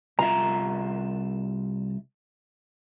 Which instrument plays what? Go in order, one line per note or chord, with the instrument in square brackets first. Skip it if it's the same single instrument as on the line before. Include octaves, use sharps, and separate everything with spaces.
[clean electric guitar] C2 F4 E5 [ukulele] A#5